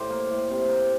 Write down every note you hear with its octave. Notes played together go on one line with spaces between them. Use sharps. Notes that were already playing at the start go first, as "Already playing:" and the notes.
Already playing: A2 G4 C5 D5
A#3
A2
C3
A#3